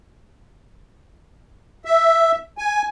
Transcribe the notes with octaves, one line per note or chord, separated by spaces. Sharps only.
E5
G#5